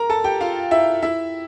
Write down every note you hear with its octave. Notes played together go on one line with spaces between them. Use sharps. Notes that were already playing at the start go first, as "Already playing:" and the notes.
Already playing: A#4 A#5
A4 A5
G4 G5
F4 F5
E4 E5
E4 E5